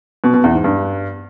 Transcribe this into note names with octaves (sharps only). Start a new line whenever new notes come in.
B2
B2
E2
G#2
G2